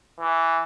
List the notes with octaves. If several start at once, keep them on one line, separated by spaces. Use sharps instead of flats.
E3